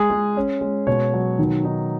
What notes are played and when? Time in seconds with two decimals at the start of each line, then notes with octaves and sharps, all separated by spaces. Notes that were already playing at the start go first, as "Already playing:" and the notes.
Already playing: G#3 G#4
0.10 G#3
0.37 C#4
0.61 G#3
0.87 B2 C#5
1.14 F#3
1.39 D#3
1.64 D#4